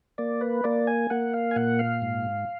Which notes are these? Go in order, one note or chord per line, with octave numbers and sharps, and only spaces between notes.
A#3 D5
B4
A#3 D5
G#5
A#3 F#5
F5
G#5
A#2 F#5
F5
G#2